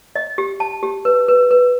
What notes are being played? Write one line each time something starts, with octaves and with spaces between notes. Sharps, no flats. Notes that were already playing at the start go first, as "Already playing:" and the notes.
D#5
G4
A5
G4
B4
B4
B4